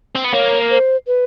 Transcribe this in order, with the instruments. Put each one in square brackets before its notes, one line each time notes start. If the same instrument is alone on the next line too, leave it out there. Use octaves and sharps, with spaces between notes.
[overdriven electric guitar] C4
B3
[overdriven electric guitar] A#3 [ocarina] C#5
[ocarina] C5
B4